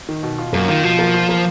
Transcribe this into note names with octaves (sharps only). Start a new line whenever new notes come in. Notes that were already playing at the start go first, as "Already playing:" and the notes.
D#3
B2
F4
F#2 A#3
D#3 F4
B2 F3
A#3
F4
A#3